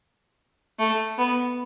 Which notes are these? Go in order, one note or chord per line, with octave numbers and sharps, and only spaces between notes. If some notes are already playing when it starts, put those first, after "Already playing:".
A3
B3